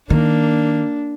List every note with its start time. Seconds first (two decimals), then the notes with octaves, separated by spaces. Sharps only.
0.10 D#3 A#3 D4